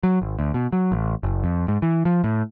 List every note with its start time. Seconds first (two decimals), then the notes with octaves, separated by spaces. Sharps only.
0.03 F#3
0.22 G#1
0.39 D2
0.54 B2
0.73 F#3
0.92 A1
1.23 F#1
1.44 F2
1.68 G#2
1.82 E3
2.05 F3
2.24 A2